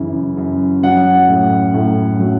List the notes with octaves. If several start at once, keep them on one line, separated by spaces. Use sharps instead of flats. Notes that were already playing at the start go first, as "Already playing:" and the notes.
Already playing: F#2 C#3 E3
F#2
F#3 F#5
A2
A2
F#3